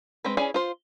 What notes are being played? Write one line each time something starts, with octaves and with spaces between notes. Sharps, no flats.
G#3 C4 B4
C#4 E4 G#4 D5 G#5
F4 C5